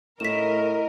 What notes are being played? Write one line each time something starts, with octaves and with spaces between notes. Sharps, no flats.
A2 A#4 D#5 B6 E7